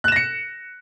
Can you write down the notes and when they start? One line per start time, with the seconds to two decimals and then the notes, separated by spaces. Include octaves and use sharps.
0.04 F#6
0.08 E7
0.12 A#6
0.16 C#7